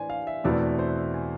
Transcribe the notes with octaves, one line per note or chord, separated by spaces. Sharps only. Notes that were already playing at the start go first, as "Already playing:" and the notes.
Already playing: A2 E3 D4 B4 C5 D5 G#5
F5
E5
E2 B2 A3 C4 E4 D5
C5
G#5